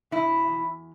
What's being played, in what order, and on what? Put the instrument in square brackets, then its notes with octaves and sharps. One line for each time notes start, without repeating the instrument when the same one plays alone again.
[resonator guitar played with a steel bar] B2 E4
E2